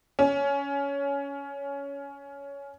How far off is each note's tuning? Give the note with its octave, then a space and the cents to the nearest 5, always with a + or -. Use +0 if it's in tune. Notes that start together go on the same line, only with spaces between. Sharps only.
C#4 +20